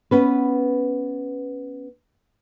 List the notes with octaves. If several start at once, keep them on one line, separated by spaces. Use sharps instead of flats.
B3 C#4 B4